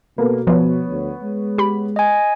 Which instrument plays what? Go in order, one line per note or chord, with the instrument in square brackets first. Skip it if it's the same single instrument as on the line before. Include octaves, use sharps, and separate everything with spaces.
[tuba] B2 [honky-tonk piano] A#3 B3 A4
[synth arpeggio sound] F3 [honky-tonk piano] B3 C#5
[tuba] D2
G#3
[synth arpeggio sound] G4 B5
[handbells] D#5 G#5